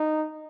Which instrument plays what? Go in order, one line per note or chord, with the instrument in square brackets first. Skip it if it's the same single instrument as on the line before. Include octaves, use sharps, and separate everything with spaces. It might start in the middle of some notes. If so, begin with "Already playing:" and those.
Already playing: [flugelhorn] D#4